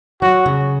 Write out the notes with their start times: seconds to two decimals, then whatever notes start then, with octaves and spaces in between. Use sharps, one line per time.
0.22 F#3 F#4
0.46 C#3